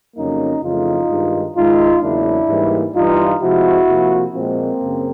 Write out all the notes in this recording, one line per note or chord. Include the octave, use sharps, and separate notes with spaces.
F2 C#3 F#3 A#3 C#4 D#4
F2 C#3 E3 A3 D#4 F4
G2 D#3 G#3
G#2 D#3 G#3 D#4 F4
E2 C#3 F#3 A#3 D4 E4
G#2 E3 G3 A#3
G2 E3 G3 D#4 F4
C3 F3 G#3 E4 F#4
C3 F3 A#3
A#2 F3 G#3 A#3 C4
F#2 C#3